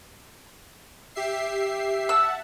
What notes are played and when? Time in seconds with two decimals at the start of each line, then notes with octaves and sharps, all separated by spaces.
1.15 G4 E5 C7
2.09 E5 F#5 A5 E6